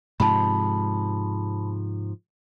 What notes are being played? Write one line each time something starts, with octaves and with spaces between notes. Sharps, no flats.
G#2 C3 F3 A5 B5